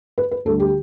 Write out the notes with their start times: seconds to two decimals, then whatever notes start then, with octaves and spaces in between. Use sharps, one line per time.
0.18 B4
0.31 B4
0.45 D2 D3 G3 A4
0.60 G4